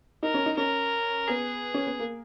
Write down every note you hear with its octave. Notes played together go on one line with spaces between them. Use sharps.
D#4 A#4
C#4
D#4
C#4 A#4
B3 G#4
C#4
B3
A#3